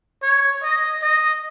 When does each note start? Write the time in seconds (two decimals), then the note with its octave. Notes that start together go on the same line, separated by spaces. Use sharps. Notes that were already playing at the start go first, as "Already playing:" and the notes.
0.23 C#5
0.63 D#5
1.03 D#5